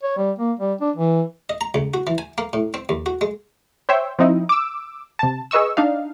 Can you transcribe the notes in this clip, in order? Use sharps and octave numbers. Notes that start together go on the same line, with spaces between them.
C#5
G3
A#3
G3
D4
E3
D#5
A#5
C#2
F#4
E3
G#5
A#3
A2
C4
D#2
F#4
G#3
C5 C#5 E5 G5
F3 C4 D#4 E4
D6 E6
C3 A5
G#4 B4 D#5 C#6 E6
D4 D#4 F5